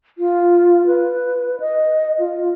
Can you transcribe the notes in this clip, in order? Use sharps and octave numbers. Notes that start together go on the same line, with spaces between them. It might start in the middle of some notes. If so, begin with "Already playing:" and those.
F4
B4
D#5
F4